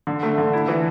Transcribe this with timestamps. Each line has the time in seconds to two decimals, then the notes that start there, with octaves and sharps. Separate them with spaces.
0.07 D3
0.23 A3
0.38 D3
0.53 E4
0.68 E3